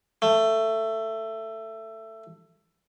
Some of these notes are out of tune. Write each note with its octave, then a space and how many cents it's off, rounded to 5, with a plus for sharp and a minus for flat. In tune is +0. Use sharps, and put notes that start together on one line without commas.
A3 +15